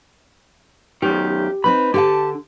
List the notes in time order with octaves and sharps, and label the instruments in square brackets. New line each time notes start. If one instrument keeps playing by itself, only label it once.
[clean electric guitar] F#2 D#3 [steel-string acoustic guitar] G4
[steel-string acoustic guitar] C4 D#4 B4 [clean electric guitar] B5
[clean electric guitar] D3 [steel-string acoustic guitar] G4 F5 A5